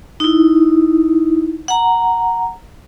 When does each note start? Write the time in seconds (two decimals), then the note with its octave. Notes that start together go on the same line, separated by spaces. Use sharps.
0.20 D#4 E4
1.68 F#5 A#5